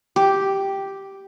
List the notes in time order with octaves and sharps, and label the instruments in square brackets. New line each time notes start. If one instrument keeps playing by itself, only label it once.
[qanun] G4